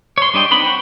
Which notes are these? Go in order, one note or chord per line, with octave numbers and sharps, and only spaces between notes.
C#5 C6
G3 D4 D#5 G5 C6
B3 C4 D#4 B4 B5
F#4 C#5 G5